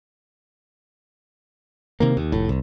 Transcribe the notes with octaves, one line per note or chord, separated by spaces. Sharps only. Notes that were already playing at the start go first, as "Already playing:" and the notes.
C3 D#3 A#3
D#2
F1 A2
C2